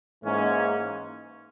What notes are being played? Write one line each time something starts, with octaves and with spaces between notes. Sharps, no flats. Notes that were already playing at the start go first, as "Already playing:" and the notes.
G#2 E3 A#3 C#4